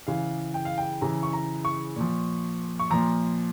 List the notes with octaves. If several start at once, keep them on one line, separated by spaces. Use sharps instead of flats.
C#3 E3 F5
G5
F5
G5
C#3 E3 A#5
C#6
A#5
C#6
A#2 F3
C#6
A#2 F3 A#5